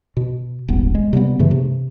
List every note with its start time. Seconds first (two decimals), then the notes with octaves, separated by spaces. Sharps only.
0.17 B2
0.68 D#1 G#1 B3
0.95 G#3
1.13 C3 G3 A#3 B3
1.39 G2 C#3 E3 A3
1.51 C3